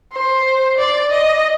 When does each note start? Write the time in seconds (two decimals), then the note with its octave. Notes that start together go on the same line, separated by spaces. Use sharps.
0.12 C5
0.78 D5
1.11 D#5